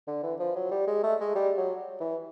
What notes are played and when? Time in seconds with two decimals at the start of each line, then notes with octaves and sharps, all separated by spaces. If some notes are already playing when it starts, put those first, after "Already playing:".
0.07 D3
0.23 E3
0.39 F3
0.55 F#3
0.71 G3
0.87 G#3
1.03 A3
1.20 G#3
1.35 G3
1.57 F#3
2.00 E3